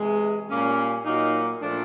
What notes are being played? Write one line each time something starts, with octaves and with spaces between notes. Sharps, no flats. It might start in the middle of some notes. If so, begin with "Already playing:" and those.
Already playing: C3 E3 G#3
A#2 G3 A#3 C#4
A#2 F#3 A#3 D#4
A#2 F3 A3 D4